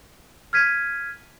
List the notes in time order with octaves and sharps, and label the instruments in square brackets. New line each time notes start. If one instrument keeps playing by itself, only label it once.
[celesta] F6 G#6 B6 D#7